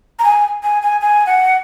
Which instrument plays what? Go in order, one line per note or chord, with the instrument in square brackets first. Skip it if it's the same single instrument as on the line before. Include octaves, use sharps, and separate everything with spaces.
[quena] A#5
G#5
G#5
G#5
G#5
F#5